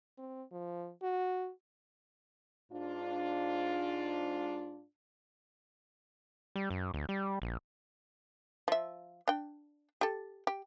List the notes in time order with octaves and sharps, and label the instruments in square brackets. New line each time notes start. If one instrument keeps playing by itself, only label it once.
[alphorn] C4
F3
F#4
[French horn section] G#2 D4 F4
[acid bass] G3
F#2
D2
G3
A#1
[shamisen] F3 E5
D4 G5
G4 A4
G4